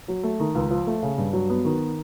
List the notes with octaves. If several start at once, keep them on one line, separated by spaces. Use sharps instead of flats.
F#3
A3
D#3
C#2
F3
A3
C#3
G2
F#3
B3
D#3